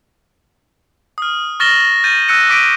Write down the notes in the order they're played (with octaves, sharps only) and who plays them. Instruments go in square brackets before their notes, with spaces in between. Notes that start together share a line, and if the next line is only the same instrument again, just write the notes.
[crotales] D#6 F6
C#6 F6 A6 A#6 E7 G7
F6 G6 A6 D#7
E6 F#6 A#6 C#7 D#7
D6 B6 D7 D#7